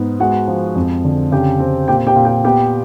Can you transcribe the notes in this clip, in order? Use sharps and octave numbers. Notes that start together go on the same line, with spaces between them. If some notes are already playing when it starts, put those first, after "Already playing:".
Already playing: G#2 B3
G#3 F#4 F#5
F3
F2
D3
C#3 G4 G5
C4
A#2 G4 G5
G4 G5
A#2
G4 G5
B3 G4 G5